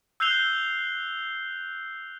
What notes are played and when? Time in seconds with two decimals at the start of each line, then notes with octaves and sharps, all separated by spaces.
0.20 E6 F#6 G6 C7 F7 G7